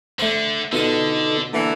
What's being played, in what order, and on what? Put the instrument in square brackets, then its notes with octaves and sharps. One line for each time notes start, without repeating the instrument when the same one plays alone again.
[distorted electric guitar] D3 [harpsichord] A3 C5
[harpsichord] B2 F4 D#6 [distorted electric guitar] D3 [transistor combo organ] B3 D#4 A4
[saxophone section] D3 E3 [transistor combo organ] A#3